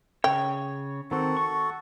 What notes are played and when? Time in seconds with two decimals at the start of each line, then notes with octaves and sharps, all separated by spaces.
0.24 C#3 C#5 G5
1.11 D#3 C4 F#4 A4
1.37 C#6